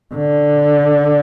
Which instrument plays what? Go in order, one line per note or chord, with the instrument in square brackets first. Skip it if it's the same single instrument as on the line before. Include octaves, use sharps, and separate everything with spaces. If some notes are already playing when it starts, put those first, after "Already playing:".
[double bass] D3